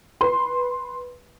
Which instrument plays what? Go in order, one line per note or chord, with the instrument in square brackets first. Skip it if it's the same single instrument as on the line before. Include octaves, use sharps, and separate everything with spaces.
[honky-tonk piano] B4 C6